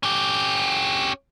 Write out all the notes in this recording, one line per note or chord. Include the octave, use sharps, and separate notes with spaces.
C#4 G4